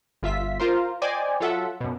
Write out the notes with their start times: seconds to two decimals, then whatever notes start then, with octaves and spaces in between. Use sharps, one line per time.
0.23 G1 F4 E5 B6
0.60 F4 A#4 C5
1.02 C5 D5 D#5 G5 G#5
1.40 F#3 F4 A4 E5 F#5
1.81 F#2 B2